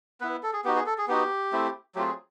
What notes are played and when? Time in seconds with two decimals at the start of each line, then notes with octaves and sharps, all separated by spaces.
0.21 B3 E4 B4
0.43 A4
0.53 G#4
0.65 B3 D#4 F#4 G4
0.76 G#4
0.86 A4
0.98 G#4
1.08 B3 D#4 F#4 G4
1.52 A3 C4 E4
1.95 F#3 A3 C4 F4 G4
2.06 G#4